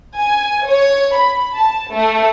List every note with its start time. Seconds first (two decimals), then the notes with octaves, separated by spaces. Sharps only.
0.17 G#5
0.66 C#5
1.16 B5
1.57 A5
1.94 A3